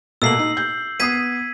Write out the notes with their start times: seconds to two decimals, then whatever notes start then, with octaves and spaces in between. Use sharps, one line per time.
0.22 B2 A3 A#3 E6 C7 F#7
0.39 D#4
0.57 G6
1.00 B3 D#6 G#6 B6 C7 D#7